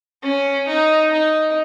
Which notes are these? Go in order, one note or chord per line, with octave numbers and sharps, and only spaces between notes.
C#4
D#4
D#4